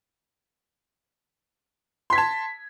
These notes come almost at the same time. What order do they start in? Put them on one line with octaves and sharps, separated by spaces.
C6 B6 G#6 A5